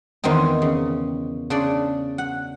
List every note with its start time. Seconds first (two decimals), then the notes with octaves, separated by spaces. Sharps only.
0.24 E2 D#3 C4 D#4
0.62 C#3
1.50 C#3 D4 D5
2.18 F#5